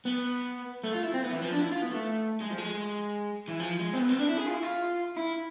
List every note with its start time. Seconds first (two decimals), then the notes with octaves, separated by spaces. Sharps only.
0.05 B3
0.84 A3
0.93 F4
1.03 E4
1.14 C4
1.23 B3
1.32 E3
1.42 F3
1.53 D4
1.62 E4
1.72 F4
1.82 B3
1.92 A3
2.40 G#3
2.50 F3
2.58 G#3
3.48 E3
3.60 F3
3.79 G#3
3.93 C4
3.99 B3
4.09 C4
4.19 D4
4.29 E4
4.38 G#4
4.47 F4
4.54 E4
4.63 F4
5.17 E4